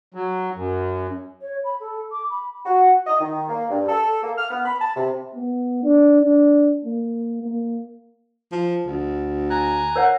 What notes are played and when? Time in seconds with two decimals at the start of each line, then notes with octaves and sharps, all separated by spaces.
0.14 F#3
0.55 F#2
1.42 C#5
1.64 B5
1.80 A4
2.12 D6
2.30 B5
2.66 F#4
3.07 D#5
3.20 D#3
3.49 A#3
3.70 G2
3.89 A4
4.23 A#3
4.38 F6
4.51 B3
4.65 B5
4.81 A5
4.96 C3
5.35 B3
5.83 D4
6.21 D4
6.85 A#3
7.43 A#3
8.52 F3
8.86 D2
9.50 G#5 A#5 F#6
9.96 A#4 C#5 F#5